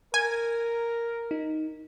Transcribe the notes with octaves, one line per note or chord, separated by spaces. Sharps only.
A#4 G#5
D#4